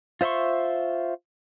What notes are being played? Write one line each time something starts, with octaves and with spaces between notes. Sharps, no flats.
F4 C5 E5 C6 C#6